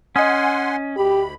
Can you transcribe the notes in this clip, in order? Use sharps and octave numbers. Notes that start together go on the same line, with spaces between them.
C#4 D#5 F#5 G#5 C6 D#6
D2 G4 B5